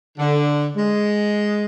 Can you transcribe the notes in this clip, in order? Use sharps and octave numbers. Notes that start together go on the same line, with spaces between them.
D3
G#3